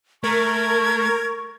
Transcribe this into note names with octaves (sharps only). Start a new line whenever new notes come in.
A3 A#4 C#6 G#6